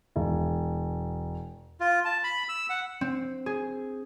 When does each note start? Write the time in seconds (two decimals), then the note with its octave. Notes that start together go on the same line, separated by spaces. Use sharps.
0.16 E1
1.80 F4
2.05 A5
2.24 B5
2.49 E6
2.70 F#5
3.01 C4
3.46 G#4